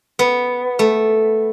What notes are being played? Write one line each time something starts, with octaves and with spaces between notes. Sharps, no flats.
B3
A3